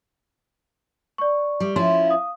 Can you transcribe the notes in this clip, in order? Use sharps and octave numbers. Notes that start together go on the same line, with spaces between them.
D5 C#6
G3
F3 C#4 E4 C6
F5 D#6